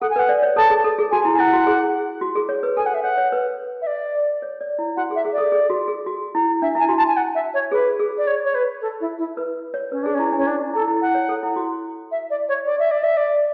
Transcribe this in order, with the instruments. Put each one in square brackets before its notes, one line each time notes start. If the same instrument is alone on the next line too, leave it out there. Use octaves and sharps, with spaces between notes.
[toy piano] A4 [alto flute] F#5
[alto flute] G#5
[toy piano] B4 [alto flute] F#5
[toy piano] D5
C#5
[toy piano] A4 [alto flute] A5
[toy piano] G#4
A4
G#4
[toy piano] F#4 [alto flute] G#5
[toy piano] E4
[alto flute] G#5
[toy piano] E4 [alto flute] F#5
[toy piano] F#4
G#4
F#4
G#4
C#5
B4
[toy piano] A4 [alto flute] G#5
[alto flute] F#5
E5
[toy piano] C#5 [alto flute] F#5
[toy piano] C#5
B4
[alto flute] E5
D5
[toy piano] C#5
D5
E4
[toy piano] F#4 [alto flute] F#5
[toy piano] G#4
[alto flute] E5
[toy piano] G#4
[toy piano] A4 [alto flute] D5
[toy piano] G#4
F#4
G#4
F#4
E4
[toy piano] D4 [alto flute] E5
[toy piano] E4 [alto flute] G#5
[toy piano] F#4
[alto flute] A5
G#5
F#5
E5
C#5
[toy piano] G#4 [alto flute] B4
[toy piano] G#4
[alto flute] D5
C#5
C#5
B4
A4
E4
E4
[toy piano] B4
C#5
[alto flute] C#4 [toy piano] B4
[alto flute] D4 [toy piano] G#4
[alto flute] C#4 [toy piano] E4
[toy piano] D4
[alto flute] C#4
D4
[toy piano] E4
[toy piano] E4 [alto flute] A4
[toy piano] E4
[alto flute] F#5
[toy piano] C#5
A4
E4
F#4
[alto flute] E5
D5
C#5
D5
E5
D5
E5
D5